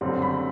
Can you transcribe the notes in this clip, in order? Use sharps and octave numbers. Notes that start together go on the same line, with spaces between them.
F#1 F#2 D3 G3 C4
B5